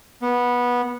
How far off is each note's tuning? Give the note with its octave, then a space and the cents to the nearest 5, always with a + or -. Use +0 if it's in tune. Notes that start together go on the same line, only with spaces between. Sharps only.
B3 -15